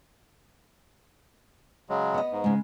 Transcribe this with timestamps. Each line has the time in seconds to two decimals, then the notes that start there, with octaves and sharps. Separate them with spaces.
1.90 C#3 F#3 G#3
2.14 B3 D#5
2.32 G#2
2.44 C#3 G#3